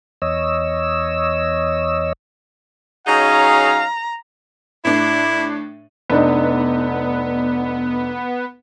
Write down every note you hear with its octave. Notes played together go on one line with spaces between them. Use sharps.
E2 C#5 D#5 E6
F#3 C#4 D#4 G#4 F5 A#5
A2 D4 E4
F1 B3 D4 D#4